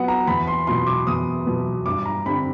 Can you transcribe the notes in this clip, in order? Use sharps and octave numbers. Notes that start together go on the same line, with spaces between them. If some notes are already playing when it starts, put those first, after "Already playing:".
Already playing: F#3 B3 F#5
A#5
E2 B5
C6
B2 F#3 B3 C6
D6
E2 D#6
B2 F#3 B3
G2 D6
A#5
D3 G3 C4 B5